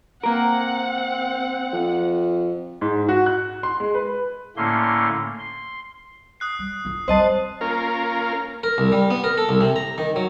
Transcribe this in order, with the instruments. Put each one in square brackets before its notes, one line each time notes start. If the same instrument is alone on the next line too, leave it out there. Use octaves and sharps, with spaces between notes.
[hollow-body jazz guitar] A#3 A#4 [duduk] C4 [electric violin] F#5
[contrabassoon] F2
[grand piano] G#2
F#4
F#6
C6
G#3
B4
[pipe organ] A2 D3 A3 A#3 C#4 C6
C6
[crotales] D#6 F#6 C7
[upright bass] G3
F2 D3
[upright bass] G3 C4 [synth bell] C5 D#5 A5
[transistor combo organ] A#3 C#4 F4 A#4
[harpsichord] A#4
C2
G3
B3
A#4
A4
C2
C3
A#5
D#3
F#3